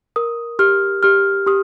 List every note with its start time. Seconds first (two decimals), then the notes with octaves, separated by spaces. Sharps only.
0.16 A#4 D#6
0.59 G4 F6
1.03 G4 F6
1.46 G4 D#6